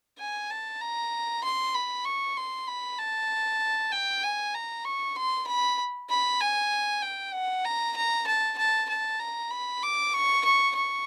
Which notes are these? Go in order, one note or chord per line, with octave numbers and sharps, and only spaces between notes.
G#5
A5
A#5
C6
B5
C#6
C6
B5
A5
G5
G#5
A#5
C#6
C6
B5
B5
G#5
G5
F#5
A#5
A#5
A5
A5
A5
A#5
B5
D6
C#6
C#6
C#6